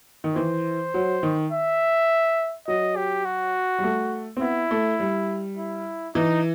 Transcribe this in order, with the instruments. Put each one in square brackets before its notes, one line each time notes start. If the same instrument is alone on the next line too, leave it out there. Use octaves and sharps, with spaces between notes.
[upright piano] D#3
[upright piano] E3 [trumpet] C5
[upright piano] F#3
D#3
[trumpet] E5
[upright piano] F#3 [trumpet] D#5
[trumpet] G4
F#4
[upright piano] G3
A3
C4
[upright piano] B3 [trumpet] E4
[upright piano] A3
G3
[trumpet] E4
[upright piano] E3 [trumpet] D#4